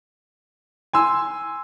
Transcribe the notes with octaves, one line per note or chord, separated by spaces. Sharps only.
G#5 C6 E6